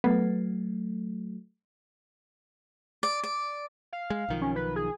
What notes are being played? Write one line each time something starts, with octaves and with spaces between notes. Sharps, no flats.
F#3 A3 B3
D5
D5
F5
G#3
B1 D#3 F3
C#4
B4
G#4